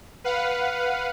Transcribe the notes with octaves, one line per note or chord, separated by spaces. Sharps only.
B4 F5 F#5